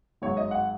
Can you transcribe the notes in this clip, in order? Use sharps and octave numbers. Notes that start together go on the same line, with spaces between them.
G#1 G#2 F#3 C#5
D#5
F#5